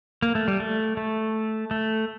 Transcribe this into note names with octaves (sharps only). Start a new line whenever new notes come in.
A#3
A3
G3
A3
A3
A3